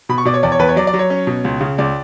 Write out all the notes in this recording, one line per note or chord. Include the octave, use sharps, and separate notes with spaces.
B2 B5
C#6
B2 D5
C#5
E2 D5
C#5
E2 B4
C#5
F#3 D5
D5
F#3
C#5
C#4
B2
C#2
C#3
C#2 D5